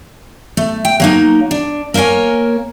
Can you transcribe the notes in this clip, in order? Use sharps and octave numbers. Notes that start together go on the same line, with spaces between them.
A3
G5
F#3 A#3 D#4
D4
A#3 A#4 C5 C#5 G#5